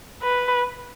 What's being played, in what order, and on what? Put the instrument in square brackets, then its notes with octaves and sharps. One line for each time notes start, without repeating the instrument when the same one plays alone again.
[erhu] B4